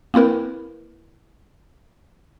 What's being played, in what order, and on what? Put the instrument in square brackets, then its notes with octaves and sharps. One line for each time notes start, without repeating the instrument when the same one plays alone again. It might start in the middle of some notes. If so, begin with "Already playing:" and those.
[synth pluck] A#3 C4 E4 A#4 B4